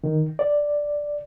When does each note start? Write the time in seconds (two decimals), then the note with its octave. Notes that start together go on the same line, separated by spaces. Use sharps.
0.04 D#3
0.39 D5